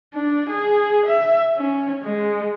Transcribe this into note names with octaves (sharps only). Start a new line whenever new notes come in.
D4
G#4
E5
C#4
G#3